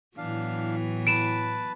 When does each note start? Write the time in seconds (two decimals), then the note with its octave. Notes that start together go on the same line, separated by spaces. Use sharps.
0.17 A2 E3 F#3 B3 D4 F5
1.07 B4 A5 D7 E7